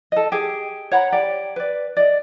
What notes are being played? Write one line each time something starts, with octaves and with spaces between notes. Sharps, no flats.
A4 D#5
G4 G#4
C#5 F#5 A#5 B5
G4 D5
B4 D5
D5 D#5